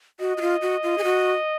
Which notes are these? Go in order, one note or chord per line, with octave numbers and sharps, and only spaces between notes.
F#4 D#5
F#4
F4
F#4
F4
G#4
F#4